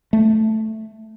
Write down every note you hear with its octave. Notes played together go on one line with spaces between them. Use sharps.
A3